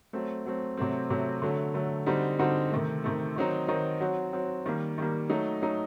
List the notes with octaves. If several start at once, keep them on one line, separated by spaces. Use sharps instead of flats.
F#3 A3 C4
F#3 A3 C4
C3 F#3 A3 C4
C3 F#3 A3 C4
D3 F#3 A3
D3 F#3 A3
D3 G3 C4 D#4 F#4
D3 G3 C4 D#4 F#4
C3 D#3 A3
C3 D#3 A3
D#3 F#3 C4 D#4
D#3 F#3 C4 D#4
F#3 C4 F#4
F#3 C4 F#4
D#3 G3 A#3
D#3 G3 A#3
F#3 A3 D#4
F#3 A3 D#4